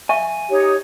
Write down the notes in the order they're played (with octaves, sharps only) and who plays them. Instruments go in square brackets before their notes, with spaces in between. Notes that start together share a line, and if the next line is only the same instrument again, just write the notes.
[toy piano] E5 F5 C#6 [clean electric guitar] G#5
[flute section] D#4 C#5 [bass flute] G4